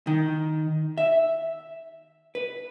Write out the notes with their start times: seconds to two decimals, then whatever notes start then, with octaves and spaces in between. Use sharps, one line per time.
0.07 D#3
0.98 E5
2.35 B4